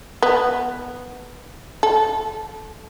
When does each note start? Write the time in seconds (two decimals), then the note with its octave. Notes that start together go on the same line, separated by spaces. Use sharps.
0.22 B3
1.83 A4